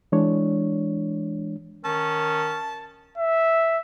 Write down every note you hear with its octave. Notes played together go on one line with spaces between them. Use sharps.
E3 G#3 D4 C#5
D#3 C#4 A5
E5